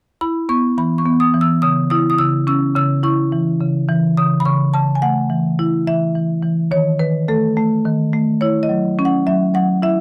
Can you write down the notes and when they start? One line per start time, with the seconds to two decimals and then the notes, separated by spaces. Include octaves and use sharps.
0.21 E4 B5
0.49 B3 C#6
0.78 E3 B5
0.98 C#6
1.06 B3
1.20 D#6
1.34 E3
1.41 E6
1.62 C#3 D#6
1.90 E4 D#6
2.10 D#6
2.18 C#3 E6
2.47 C#4 E6
2.75 C#3 E6
3.03 E4 C#6
3.32 E3
3.60 C#3
3.88 E3
4.17 C#3 D#6
4.40 B5
4.45 C#3 C#6
4.74 C#3 A5
4.95 G#5
5.02 A3 F#5
5.30 E3
5.59 E4
5.87 E3 E5
6.15 E3
6.43 E3
6.71 D#3 C#5
6.99 D#3 B4
7.28 A3 A4
7.57 A3
7.85 D#3
8.13 A3
8.41 E4 C#5
8.63 D#5
8.69 F#3
8.99 C#4
9.05 F#5
9.26 F#3 E5
9.54 F#3 F#5
9.82 E4 E5